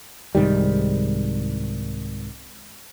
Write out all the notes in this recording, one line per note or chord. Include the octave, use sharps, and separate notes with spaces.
C2 G#2 D#3 G3